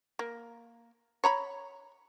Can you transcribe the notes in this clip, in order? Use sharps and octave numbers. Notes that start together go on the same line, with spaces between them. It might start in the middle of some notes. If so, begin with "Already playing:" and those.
A#3
C#5 A#5 B5